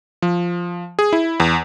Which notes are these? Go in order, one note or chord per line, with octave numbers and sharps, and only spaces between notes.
F3
G#4
E4
E2